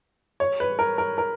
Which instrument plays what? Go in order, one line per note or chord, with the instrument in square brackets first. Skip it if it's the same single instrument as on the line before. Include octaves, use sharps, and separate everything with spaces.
[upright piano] C#5
B4
A#4
A#4
A#4